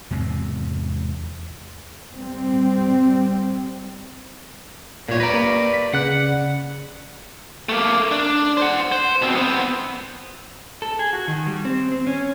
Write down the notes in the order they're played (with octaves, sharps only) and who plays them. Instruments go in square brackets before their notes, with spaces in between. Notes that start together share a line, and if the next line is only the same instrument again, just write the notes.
[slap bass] E2 G#2 C3 C4
[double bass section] G3 C4
[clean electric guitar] A#2 C#5 [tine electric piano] A#3 F4
[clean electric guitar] B4 D5 [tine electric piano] A#5 A#6
[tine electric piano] A#3
B6
[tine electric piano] C#3 D5 F#6 [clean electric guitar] F#5
[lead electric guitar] A3 A#3
D4
C5 F#5
C5
B2 C4
B3 C4
[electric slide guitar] A4
G#4
F#4
D#3
G3
C4
C4
C#4